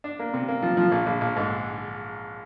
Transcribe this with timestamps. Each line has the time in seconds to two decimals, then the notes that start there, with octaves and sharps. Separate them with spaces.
0.04 D4
0.19 A#3
0.34 C3
0.48 A#3
0.62 F3
0.77 F3
0.92 A#1
1.06 A#1
1.21 A#1
1.36 G#2